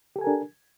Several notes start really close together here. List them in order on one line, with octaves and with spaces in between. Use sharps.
G4 A4 G#5 A#4 D4